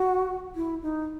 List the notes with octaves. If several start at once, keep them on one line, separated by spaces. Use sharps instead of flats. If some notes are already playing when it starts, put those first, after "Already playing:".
Already playing: F#4
E4
D#4